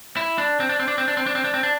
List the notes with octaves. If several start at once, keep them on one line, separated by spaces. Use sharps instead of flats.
E4
D4
C4
D4
C4
D4
C4
D4
C4
D4
C4
D4
C4
D4